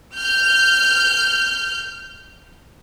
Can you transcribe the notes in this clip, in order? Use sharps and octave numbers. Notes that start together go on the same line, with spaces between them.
F6 G6